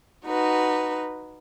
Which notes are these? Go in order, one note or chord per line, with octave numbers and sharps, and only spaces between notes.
D#4 F#4 B4